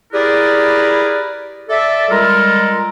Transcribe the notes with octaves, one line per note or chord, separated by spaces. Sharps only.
E4 G4 G#4 A#4 B4 D5
A4 D5 E5
G3 G#3 F4 A4 A#4